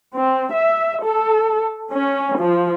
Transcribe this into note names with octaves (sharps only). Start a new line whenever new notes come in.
C4
E5
A4
C#4
F3